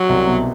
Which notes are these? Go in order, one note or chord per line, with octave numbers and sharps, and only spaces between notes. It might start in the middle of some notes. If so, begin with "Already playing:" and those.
Already playing: F#3
C2 C3
B1 B2